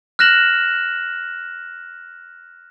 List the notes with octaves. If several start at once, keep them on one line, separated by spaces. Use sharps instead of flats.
F6 F#6 A#6 E7 F#7